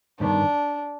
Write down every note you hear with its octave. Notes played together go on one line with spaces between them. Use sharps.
G2 D#3 B3 D4